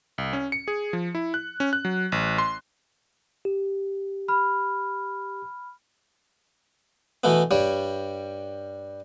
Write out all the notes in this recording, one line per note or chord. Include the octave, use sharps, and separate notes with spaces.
C2
C#4
C#7
G#4
F3
E4
F#6
C#4
F#6
F#3
A1
C6
G4
B5 F6
B2 E3 A3 B3
G2 G3 C#5